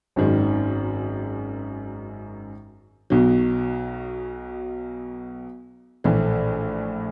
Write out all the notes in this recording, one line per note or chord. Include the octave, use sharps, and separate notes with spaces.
G#1 F#2 D#3 G#3
B1 B2 F#3
A#1 A2 E3 A3